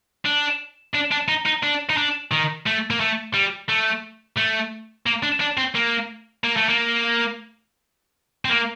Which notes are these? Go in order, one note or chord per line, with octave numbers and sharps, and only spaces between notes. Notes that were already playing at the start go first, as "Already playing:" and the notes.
D4
D4
D4
D#4
D#4
D4
D#4
D4
D#3
A3
A#3
A3
G3
A3
A3
A#3
D4
D4
C4
A#3
A#3
A3
A#3
C4
A#3